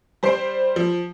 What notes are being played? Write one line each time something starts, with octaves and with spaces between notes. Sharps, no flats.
G3 C5 C6 C7 D7
F3